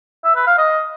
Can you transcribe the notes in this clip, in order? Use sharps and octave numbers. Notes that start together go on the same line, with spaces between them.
E5
B4
F5
D#5